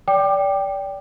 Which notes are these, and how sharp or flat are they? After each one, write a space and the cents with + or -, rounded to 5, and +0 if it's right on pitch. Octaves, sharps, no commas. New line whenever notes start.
D5 -25 G5 +0 D6 +25